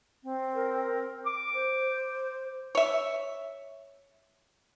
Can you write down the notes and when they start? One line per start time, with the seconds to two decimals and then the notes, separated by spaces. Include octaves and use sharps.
0.23 C4
0.55 A#4
1.26 D6
1.54 C5
2.75 C#5 E5